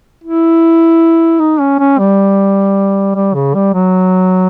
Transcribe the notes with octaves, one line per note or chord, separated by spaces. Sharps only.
E4
D#4
C#4
C#4
G3
G3
C#3
G3
F#3